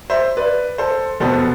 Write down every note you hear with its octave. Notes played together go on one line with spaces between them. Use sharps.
C5 E5
B4 D5
A4 C5
F1 E2 B2 B3 A4 C5